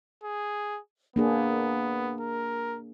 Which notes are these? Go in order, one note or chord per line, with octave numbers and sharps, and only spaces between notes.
G#4
A#3 B3 D4 G#4
A#4